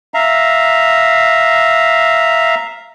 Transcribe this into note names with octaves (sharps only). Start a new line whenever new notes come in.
E5 F5 A#5